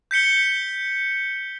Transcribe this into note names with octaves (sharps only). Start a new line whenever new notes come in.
G6 B6 C#7 G7